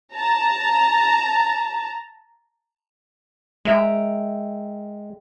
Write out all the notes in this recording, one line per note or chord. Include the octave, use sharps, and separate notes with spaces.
A5 A#5
G#3 A#4 E5 G5